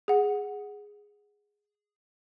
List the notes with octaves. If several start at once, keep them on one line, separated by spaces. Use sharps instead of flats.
G#4 F#5